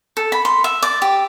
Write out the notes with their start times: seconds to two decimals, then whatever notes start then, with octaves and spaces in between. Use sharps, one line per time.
0.17 A4
0.32 B5
0.45 C6
0.64 E5
0.82 D5
1.02 G4